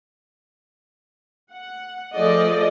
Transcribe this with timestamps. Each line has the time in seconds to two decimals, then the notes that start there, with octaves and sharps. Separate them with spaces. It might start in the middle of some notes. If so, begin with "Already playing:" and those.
1.52 F#5
2.15 F3 A3 G#4 A4 D5 D#5